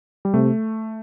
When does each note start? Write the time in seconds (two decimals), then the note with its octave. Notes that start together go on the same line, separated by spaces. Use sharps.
0.25 G3
0.34 C3 A3